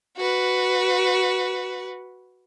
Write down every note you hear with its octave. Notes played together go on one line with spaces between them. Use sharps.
F#4 B4